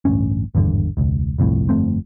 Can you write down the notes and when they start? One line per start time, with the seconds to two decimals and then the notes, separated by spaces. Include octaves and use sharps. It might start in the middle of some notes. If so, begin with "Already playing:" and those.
0.05 A1 D2 G2 C#4
0.55 G#1 E2 G2 D3
0.97 E1 C#2
1.38 G1 C2 F2 A2
1.69 G1 F2 A3 C4